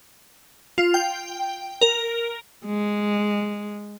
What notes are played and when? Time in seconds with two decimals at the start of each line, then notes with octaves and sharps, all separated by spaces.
0.78 F4
0.94 G5
1.81 A#4
2.66 G#3